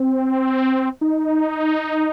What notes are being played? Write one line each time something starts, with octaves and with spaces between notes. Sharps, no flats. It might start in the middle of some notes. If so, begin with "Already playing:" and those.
Already playing: C4
D#4